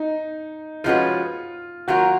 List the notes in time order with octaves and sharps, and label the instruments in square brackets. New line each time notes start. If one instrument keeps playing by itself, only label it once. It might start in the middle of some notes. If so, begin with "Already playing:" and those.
Already playing: [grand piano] D#4
[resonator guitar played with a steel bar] F3 G#3 C#4 F#4 B4 [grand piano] F4
[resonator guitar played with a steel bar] D#3 F#3 A#3 F4 A#4 [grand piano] F#4